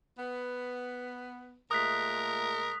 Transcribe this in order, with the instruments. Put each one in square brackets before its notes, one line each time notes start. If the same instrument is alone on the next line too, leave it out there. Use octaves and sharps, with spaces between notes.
[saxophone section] B3
[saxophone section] A#2 G#3 A3 [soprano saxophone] A#4 [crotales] D#6 F#6 B6